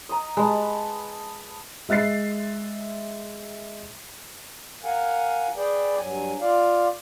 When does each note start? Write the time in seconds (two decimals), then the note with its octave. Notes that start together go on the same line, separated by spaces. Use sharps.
0.09 D#5 A#5
0.37 G#3 B4 A5
1.89 G#3 E5 F#6 A6 C7
4.84 A#4 F5 F#5 G#5
5.56 G#4 B4 D5 G5
5.97 G2 F#3 G#5
6.40 F4 D5 F5